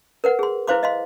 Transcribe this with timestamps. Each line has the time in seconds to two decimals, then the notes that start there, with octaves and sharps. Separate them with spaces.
0.24 A#4 B4 F#5
0.39 G#4 C6
0.67 E4 B4 C5 F5 C6 D6
0.83 D#5 F5 C6